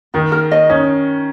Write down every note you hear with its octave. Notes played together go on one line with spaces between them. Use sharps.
D#3 D#4
A#4
D#5
C#4 D#4